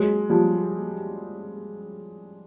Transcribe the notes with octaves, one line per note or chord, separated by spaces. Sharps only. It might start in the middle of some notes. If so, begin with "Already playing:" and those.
Already playing: F#3 G#3
F3 G3